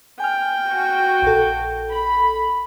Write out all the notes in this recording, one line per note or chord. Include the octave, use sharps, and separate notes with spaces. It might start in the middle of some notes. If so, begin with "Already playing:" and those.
G5 G#5 F6
F#4
A#1 A4
B5